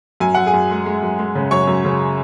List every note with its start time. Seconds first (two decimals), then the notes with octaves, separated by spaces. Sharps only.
0.20 F#2 G#5
0.35 F#2 F#5
0.46 G#4 G#5
0.53 F#2
0.71 G#3
0.86 G#3
1.03 F#2
1.19 G#3
1.35 C#3
1.51 F#2 C#5 C#6
1.67 F#2
1.85 C#3